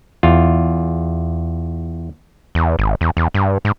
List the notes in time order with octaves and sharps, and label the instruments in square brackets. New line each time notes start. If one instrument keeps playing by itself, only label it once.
[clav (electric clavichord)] E2 F4
[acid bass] E2
G#1
E2
E2
G2
G#2